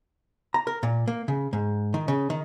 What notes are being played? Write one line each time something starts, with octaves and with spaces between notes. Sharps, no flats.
A#5
A#4
A#2
A#3
C#3
G#2
D#3
C#3
D#3